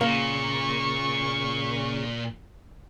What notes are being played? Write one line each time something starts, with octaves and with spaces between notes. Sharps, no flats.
A#2 C#3 A#3 C#6